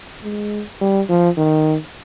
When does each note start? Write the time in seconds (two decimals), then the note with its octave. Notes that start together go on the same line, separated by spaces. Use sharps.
0.24 G#3
0.81 G3
1.09 F3
1.37 D#3